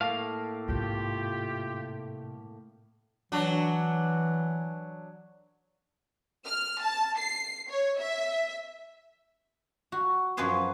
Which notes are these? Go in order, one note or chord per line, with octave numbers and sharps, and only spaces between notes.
A2 A3 A#3 F5
G#2 C3 F4 G4
E3 F#3 D4
F6
A5
C7
C#5
E5
F#4
F#2 F3 F#3 G#4 B4 C5